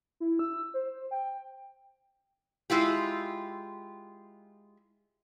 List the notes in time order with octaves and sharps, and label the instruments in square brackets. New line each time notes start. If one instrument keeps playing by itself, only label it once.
[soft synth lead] E4
E6
C5
G5
[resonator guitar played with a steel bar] G#3 E4 F4 G4